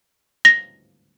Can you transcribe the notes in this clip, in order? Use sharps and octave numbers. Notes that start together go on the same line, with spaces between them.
A#6